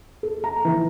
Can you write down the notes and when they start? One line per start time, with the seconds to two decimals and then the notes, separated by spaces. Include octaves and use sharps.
0.23 A4
0.44 A#5
0.65 E3